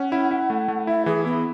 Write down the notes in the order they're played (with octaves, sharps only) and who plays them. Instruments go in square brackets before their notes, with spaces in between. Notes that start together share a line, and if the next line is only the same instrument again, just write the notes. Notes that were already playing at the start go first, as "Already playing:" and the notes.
Already playing: [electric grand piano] C#4 [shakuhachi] F#5
[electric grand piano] E4
E4
A3
A3
[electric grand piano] E4 [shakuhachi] E5
[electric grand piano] E3 [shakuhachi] G#4
[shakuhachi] B3 [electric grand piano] E4